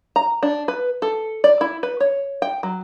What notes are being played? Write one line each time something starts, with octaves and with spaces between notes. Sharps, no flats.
A#5
D4
B4
A4
D5
E4
B4
C#5
G5
F#3